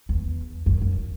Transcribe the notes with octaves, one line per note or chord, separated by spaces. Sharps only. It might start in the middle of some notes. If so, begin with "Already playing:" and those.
E2
F#2
F#2